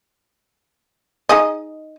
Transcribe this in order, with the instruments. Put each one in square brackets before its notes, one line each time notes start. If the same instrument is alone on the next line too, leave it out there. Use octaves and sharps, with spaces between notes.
[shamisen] D#4 G#4 D#5